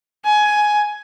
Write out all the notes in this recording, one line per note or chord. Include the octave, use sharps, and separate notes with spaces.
G#5